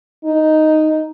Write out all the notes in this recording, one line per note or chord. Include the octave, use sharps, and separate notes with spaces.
D#4